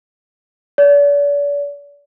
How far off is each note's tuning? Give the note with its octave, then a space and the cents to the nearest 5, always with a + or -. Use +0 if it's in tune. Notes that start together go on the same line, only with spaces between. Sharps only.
D5 -40